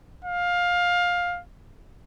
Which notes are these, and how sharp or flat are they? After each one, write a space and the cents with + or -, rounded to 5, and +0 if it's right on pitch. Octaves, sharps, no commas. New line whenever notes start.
F5 +15